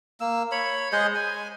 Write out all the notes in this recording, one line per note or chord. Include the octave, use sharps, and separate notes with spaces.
A#3 E6
C#5 B5
G#3 G#4 C5 D#5
G#5